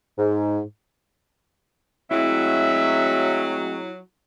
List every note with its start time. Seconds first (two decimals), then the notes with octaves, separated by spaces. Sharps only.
0.19 G#2
2.11 F#3 G#3 A3 C4 E4 E5